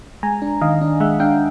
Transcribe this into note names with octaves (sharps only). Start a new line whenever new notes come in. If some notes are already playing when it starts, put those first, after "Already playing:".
G#3 G#5 A#5
D4
D#3 D#5 F5
D4
G#3 E5 F#5
D4 F5 G5